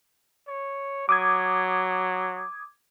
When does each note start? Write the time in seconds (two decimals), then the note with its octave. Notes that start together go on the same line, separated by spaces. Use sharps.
0.48 C#5
1.09 F#3 D6 D#6 G#6